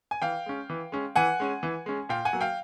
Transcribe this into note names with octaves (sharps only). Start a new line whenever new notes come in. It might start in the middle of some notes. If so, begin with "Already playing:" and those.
G#5
E3 F5 G5
G#3 C#4
E3
G#3 C#4
E3 F#5 G#5
G#3 C#4
E3
G#3 C#4
A#2 F5 G5
F#5 G#5
F#3 A#3
F5 G5